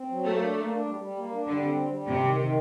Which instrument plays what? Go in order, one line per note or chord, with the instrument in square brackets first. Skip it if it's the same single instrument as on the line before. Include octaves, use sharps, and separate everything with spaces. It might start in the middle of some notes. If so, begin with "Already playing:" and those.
Already playing: [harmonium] C4
F#3
[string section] A3 [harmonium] A#3
[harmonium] D4
A#3
D4
G3
G3
A#3
D4
[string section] D3 [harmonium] G3
[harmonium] C4
G3
G3
[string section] C3 [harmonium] G4
[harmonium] D#3
D#3